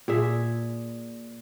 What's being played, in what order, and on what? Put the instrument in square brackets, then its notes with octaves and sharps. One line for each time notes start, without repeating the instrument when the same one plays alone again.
[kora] A#2 G#4 E5